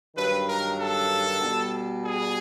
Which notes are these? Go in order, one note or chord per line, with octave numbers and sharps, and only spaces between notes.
G2 D#3 F#3 B4
A#4
A4
B2 G3
G#4